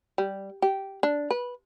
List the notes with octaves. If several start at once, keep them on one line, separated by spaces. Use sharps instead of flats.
G3
G4
D4
B4